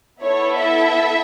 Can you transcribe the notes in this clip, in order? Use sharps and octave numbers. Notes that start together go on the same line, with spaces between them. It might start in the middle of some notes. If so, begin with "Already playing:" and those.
B3 E4 A4 C#5
E5